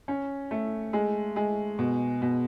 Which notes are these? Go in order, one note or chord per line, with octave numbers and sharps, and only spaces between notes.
C#4
A3
G#3
G#3
B2
B2